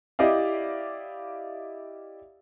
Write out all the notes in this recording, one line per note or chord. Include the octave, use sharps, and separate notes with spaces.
E4 G4 D5 D#5 F5